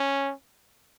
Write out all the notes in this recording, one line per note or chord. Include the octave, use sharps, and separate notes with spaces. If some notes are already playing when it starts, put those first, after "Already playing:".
Already playing: C#4